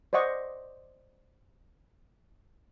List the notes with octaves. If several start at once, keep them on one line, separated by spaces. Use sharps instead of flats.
C5 D5 D#5 F#5 C#6